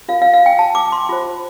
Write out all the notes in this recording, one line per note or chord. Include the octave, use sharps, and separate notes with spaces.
F4 A#4 F5
F5
F5
G5
A5
D6
C6
F4 C5